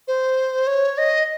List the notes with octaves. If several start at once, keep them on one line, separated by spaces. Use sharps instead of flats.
C5
C#5
D#5